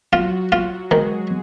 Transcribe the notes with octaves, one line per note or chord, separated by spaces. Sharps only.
F#3 F4 F#4
F#3 F4 F#4
D#3 G#3 G#4